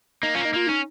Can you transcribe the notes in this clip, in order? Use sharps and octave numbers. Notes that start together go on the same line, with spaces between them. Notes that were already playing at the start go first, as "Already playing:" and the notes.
A#3 D#4
A#3 C#4 F4
D#4
A#3 F4
C#4 D#4